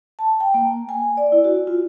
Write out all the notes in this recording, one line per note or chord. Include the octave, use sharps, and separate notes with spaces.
A5
G5
A#3
G#5
D5
E4
F#4
F4